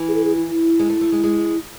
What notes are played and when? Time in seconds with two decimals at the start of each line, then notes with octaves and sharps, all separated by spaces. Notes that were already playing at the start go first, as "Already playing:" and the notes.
Already playing: E3
0.08 G#4
0.15 A4
0.25 G#4
0.36 E4
0.79 G#3
0.90 A3
1.01 A3
1.12 G#3
1.23 G#3